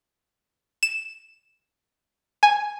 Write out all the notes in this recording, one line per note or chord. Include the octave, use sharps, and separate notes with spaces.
E7
G#5